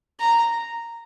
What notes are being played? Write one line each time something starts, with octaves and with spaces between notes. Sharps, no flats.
A#5